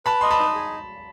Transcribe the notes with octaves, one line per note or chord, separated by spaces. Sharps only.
B4 A5 B5
D#5 C6
A5 B5
D#4
G#4